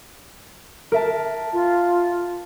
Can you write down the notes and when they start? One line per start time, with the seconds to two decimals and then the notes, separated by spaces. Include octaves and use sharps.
0.92 A#4 E5 A5
1.53 F4